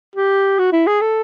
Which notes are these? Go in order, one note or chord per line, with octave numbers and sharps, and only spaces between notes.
G4
F#4
E4
G#4
A4